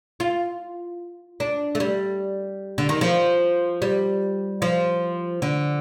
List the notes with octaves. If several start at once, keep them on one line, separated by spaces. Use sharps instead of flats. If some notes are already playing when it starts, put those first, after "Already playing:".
F4
D4
A3
G3
D3
D#3
F3
G3
F3
D3